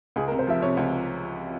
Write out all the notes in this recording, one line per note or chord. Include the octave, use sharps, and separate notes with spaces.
C#2 G#4
A#4
C3
C5
F3 E5
C3 C#5
C#2